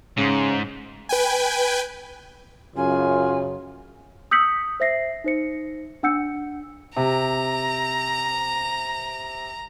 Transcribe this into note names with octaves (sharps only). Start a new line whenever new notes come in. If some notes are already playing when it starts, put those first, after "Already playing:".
G#2 C#3
B4 G5 G#5
F#2 C#3 F4 G#5
D#6 E6 G6 B6 C#7 F#7
C5 E5 A#6 C7
D#4 C5 C#7
D4 F#5 E6 G6 C#7
C3 A#5